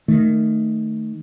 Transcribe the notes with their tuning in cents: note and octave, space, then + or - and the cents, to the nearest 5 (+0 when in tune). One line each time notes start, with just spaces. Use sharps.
D#3 -15 A3 +0